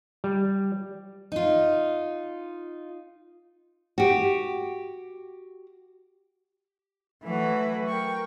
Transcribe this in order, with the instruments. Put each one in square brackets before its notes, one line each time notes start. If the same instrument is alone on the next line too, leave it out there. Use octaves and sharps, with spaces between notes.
[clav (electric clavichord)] G3
[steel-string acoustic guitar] D#4 F4
[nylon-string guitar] F#4 G4
[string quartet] E3 F#3 A3 F#4 B4
A#4 G5 C#6